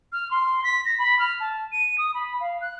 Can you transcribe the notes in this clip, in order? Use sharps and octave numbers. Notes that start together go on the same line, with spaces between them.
F6
C6
B6
A#6
B5
F6
A5
D#7
D#6
B5
F5
F#6